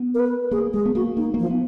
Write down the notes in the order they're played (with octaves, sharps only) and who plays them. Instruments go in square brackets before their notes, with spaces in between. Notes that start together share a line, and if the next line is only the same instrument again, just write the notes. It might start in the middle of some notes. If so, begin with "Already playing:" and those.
Already playing: [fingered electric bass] B3
[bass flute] A#4
B4
[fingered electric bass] A#3 [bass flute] G#4
[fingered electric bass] G#3 [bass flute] G#4
[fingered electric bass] B3
[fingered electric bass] A#3 [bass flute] F#4
[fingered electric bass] A#3 [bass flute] D#4
[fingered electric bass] A#3
[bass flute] F3
[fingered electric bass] B3